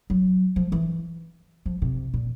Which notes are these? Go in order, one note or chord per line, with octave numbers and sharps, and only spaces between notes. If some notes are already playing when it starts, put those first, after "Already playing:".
F#3
F3
E3
F3
C3
A#2